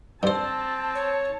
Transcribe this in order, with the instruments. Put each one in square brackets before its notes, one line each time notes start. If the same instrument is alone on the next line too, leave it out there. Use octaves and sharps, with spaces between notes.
[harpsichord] G2 C5 [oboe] C4 [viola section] A5
[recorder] C#5